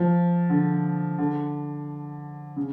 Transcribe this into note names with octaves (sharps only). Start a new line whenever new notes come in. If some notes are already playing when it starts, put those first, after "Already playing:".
Already playing: F3
D3
D3
C#3